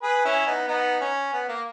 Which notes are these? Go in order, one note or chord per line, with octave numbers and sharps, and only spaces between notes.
G#4 B4
C#4 E4
B3 D#4
B3 D#4
C#4
B3
A#3